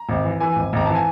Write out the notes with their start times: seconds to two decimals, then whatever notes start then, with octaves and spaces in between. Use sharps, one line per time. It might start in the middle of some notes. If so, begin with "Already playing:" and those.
Already playing: A#5
0.09 G#1
0.24 E3
0.40 E3 G#5
0.56 G#1
0.73 G#1 A#5
0.86 E3 A5
0.95 G#5